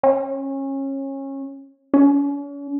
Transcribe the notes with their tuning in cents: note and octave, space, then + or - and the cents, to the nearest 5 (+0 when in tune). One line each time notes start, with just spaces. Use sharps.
C#4 -25
C#4 +40